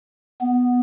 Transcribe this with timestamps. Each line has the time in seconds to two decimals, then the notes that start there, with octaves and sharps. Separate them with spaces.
0.41 B3